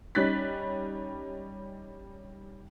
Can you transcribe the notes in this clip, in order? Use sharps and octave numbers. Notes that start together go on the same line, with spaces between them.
G3 C#4 D#4 F#6 A6 B6